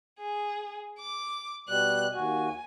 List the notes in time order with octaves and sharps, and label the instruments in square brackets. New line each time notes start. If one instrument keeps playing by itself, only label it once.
[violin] G#4
D6
[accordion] B2 G3 [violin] F#6
[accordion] D#2 F#4 [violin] G#5